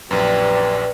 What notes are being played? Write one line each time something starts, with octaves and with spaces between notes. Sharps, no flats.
A#1 F#2 G4 B4 D5